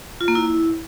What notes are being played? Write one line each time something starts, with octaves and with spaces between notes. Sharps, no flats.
F4
A#3
E4